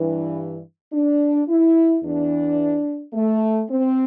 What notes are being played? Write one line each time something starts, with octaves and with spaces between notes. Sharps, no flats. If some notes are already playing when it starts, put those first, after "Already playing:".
Already playing: G2 E3
D4
E4
E2 E3 D4
A3
C4